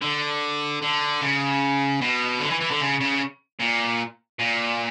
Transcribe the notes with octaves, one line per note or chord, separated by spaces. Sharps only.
D3
D3
C#3
B2
D3
E3
E3
D3
C#3
C#3
A#2
A#2